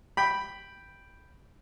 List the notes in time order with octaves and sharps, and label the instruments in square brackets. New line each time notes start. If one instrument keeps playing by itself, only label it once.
[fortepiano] G5 B5